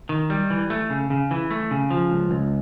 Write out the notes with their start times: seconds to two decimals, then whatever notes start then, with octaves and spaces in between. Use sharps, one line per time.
0.09 D#3
0.30 G3
0.50 E3
0.70 A3
0.90 C#3
1.10 C#3
1.31 E3
1.51 A3
1.71 C#3
1.91 F3
2.11 C#2
2.31 C#2